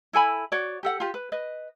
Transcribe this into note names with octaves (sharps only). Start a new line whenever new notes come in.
E4 A4 G#5 B5
F#4 C#5 D5
G4 A4 F#5
F4 G4
B4
B4 D#5